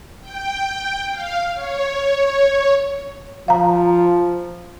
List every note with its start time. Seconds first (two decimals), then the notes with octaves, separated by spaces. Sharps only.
0.20 G5
1.11 F5
1.54 C#5
3.48 F3 F5 A#5